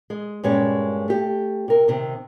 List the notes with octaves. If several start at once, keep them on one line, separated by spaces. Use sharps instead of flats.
G#3
G2 A#2 G#3 C#4 C#5
A3 G4
C3 A#4
C3 D#3